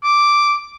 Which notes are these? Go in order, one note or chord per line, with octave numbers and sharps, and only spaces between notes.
D6